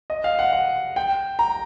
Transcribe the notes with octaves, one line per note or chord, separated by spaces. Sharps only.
D#5
F5
F#5
F#5
G5
A#5